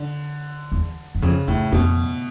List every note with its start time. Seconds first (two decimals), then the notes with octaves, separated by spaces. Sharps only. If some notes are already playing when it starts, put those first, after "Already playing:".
Already playing: D3
0.72 E2
1.15 F#2
1.22 F2 C#3
1.48 F2 A2
1.72 F2 B2